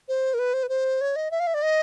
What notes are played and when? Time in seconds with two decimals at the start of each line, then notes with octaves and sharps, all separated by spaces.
0.08 C5
0.34 A#4
0.39 B4
0.54 C5
0.63 B4
0.69 C5
1.01 C#5
1.16 D#5
1.31 E5
1.40 F5
1.47 E5
1.54 D5
1.62 D#5